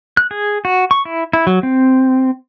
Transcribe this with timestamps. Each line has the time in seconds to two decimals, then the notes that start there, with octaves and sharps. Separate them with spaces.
0.17 F#6
0.31 G#4
0.65 F#4
0.91 C#6
1.05 E4
1.33 E4
1.47 F#3
1.63 C4